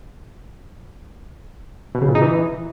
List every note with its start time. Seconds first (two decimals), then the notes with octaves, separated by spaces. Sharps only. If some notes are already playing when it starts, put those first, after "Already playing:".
1.95 B2
2.02 C#3
2.08 A#2
2.15 D#4
2.22 E3